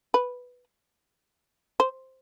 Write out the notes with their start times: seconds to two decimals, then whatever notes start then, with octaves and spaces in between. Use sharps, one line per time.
0.14 B4
1.80 C5